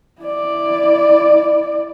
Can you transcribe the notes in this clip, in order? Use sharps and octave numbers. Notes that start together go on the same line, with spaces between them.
E4 D5